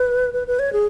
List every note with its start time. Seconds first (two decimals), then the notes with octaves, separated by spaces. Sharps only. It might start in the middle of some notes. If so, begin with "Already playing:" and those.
Already playing: B4
0.34 B4
0.47 B4
0.59 C#5
0.73 G#4